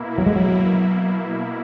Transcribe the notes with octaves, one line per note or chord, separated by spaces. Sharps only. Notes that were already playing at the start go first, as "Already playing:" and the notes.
Already playing: B2 A#3 E4
F#3
G#3
F#3